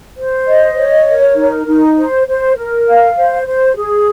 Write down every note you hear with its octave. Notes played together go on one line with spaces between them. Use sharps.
C5
D#5
C#5
A#4
D#4
D#4
C5
C5
A#4
F5
C5
C5
G#4